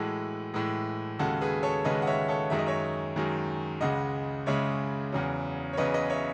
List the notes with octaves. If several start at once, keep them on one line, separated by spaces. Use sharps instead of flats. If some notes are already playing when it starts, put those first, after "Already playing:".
Already playing: A2 E3 G#3 F#4 A4
A2 E3 G#3
D#2 C#3 G#3 F#4 A4
G#4 B4
A4 C#5
D#2 C#3 G#3 B4 D#5
F#5
C#5 E5
A4 C#5
F#2 D#3 G#3 E5
D#5
C#5 E5
F#2 D#3 G#3
C#2 C#3 G#3 D#5 F#5
C#2 C#3 G#3 C#5 E5
E2 C#3 F#3
C#5
E2 C#3 F#3 B4 D#5
B4 D#5
C#5 E5